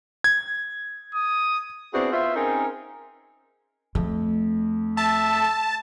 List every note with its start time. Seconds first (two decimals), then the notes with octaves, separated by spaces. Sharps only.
0.24 G#6
1.15 D#6
1.93 B3 C4 D4 E4 F#4 G#4
2.12 B3 F4 C5 E5
2.35 C4 C#4 D#4 G#4 A#4
3.95 F2 A3
4.97 E5 A5